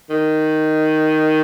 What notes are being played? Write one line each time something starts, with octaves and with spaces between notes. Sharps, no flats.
D#3